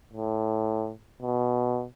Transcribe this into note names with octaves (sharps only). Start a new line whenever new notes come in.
A2
B2